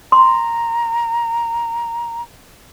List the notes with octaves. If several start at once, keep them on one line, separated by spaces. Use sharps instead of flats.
A#5 C6